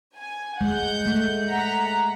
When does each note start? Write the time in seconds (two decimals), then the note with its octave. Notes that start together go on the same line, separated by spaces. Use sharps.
0.17 G#5
0.61 G#3 F#5 G6
1.06 A3
1.49 F#5 A#5 B6